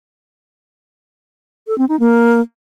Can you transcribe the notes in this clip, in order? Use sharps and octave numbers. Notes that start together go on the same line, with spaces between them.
A4
C4
D#4
A#3